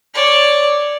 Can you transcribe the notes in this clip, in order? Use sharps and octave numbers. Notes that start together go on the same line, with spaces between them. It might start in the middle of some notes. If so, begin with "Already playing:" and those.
C#5 D5